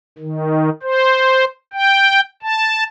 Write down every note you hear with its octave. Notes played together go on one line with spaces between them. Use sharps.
D#3
C5
G5
A5